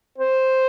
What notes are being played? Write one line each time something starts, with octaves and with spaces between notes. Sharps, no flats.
C5